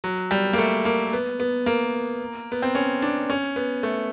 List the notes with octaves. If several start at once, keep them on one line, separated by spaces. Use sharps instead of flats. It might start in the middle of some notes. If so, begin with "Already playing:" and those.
F#3
G3
A#3
A3
A#3
B3
B3
A#3
B3
C4
C#4
D4
C#4
B3
A3